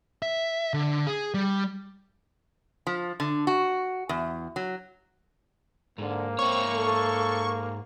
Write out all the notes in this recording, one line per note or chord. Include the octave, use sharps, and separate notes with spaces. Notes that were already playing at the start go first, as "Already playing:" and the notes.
E5
D3
G#4
G3
F3
D3
F#4
E2
F#3
G#2 D3 A#3
G#2 C4 C#5 C#6
A4